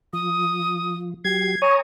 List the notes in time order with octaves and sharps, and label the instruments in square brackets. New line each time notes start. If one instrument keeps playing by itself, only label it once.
[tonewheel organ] F3 [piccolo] D#6
[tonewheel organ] F#3 G4 [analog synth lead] G#6 [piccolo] C7
[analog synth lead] C#5 [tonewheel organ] G#5 A#5 D#6 [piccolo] D#7